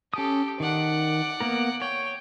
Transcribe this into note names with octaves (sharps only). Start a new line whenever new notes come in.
C#4 G4 A4 D#6
D#3 D5 F#5
A#3 B3 A#4
C#5 G5